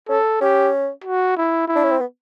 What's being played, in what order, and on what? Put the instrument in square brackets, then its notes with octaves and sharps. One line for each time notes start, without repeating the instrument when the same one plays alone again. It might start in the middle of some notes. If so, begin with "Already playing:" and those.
[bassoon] C#4 [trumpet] A4
[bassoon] C#4 [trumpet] G4
[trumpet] F#4
E4
E4
[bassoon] D4
C#4
C4
B3